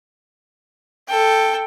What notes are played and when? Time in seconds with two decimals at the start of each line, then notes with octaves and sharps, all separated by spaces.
1.08 A4 G5